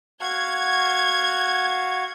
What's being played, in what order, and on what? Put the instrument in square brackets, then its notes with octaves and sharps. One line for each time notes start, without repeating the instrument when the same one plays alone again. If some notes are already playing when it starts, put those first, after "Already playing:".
[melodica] F#4 F5 F#5 [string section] G#6